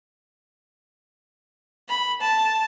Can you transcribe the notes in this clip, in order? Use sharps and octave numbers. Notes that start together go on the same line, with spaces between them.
B5
A5